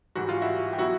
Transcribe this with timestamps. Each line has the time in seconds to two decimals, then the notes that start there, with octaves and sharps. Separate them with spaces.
0.16 G#2 E3 G3 F#4
0.29 F4
0.42 E4 F#4
0.73 G4
0.79 B2 F#3 E4 F#4